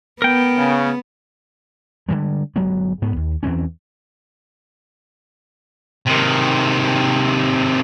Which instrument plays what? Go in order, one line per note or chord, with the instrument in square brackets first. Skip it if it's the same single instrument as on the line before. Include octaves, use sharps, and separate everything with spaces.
[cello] B3 [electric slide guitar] A#4 G5
[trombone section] C#3
[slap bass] D3 E3 G3 G#3
G1 F#3 G#3 B3
G#2 B3
D#2
E2 E3 C4 C#4
[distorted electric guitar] C3 D#3